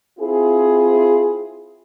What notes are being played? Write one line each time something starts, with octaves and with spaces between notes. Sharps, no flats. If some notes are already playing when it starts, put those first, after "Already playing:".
C4 E4 F4 G#4